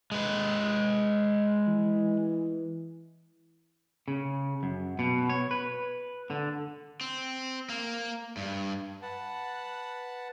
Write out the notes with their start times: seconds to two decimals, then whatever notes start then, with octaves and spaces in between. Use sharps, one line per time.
0.12 G#3 B4
1.67 E3
4.08 C#3
4.63 F#2
4.99 B2
5.30 C#5
5.51 B4
6.30 D3
7.01 C4
7.69 A#3
8.37 G2
9.02 B4 F#5 A5